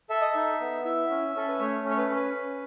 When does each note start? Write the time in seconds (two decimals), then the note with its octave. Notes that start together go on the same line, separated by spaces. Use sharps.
0.10 A4 E5
0.21 D#5
0.32 D#4 E5
0.61 B3
0.85 E4 E5
1.10 C#4
1.35 C#4 A4
1.48 B4
1.59 A3 C#5
1.84 C#4
1.90 C#5
1.98 B4
2.10 C#4
2.15 B4
2.34 C#4